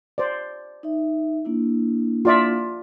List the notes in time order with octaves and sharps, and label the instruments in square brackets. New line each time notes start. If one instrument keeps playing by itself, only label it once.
[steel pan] C5 D5
[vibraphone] D#4 E5
A#3 D4 E4
[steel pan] F4 D5 E5